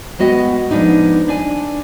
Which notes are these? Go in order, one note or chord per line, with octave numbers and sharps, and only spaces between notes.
G#3 B3 F#4 D#5 F#5 G5
F3 G#3 B3 D4 D#4
D4 G#5